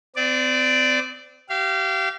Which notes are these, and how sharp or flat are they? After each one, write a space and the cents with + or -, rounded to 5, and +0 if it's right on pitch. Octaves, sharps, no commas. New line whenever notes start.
C4 -35 D5 +0
G4 -30 F5 -30